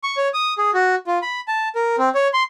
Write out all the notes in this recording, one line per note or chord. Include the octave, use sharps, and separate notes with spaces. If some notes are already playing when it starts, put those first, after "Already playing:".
C#6
C#5
D#6
G#4
F#4
F4
B5
A5
A#4
C4
C#5
C6